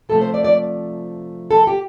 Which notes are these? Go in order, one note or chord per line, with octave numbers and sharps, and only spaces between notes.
C3 F3 A3 A4
C5
D5
D5
A4
G4